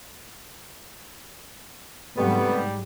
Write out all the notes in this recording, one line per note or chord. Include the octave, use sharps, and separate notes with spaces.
G#2 C3 F#3 G3 A3 B3